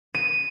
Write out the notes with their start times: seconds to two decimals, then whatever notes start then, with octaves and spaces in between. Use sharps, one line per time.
0.15 D#7